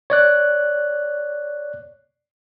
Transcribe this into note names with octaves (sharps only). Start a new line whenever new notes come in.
C#5 D5 F#6